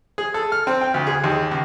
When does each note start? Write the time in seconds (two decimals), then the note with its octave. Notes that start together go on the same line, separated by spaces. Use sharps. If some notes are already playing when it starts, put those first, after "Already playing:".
0.18 G#4
0.34 A4
0.52 F6
0.67 C4
0.81 G5
0.94 D2
1.07 G#4
1.24 D#2
1.52 C#2